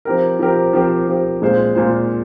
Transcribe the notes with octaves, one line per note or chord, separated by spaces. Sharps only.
F3 C4 G4 A#4
F3 C4 G4 A#4
F3 C4 G4 A#4
F3 C4 G4 A#4
A#2 G#3 C4 F4 C5
A#2 G#3 C4 F4 C5